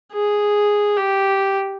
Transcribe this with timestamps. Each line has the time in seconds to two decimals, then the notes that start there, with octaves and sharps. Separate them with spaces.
0.12 G#4
0.97 G4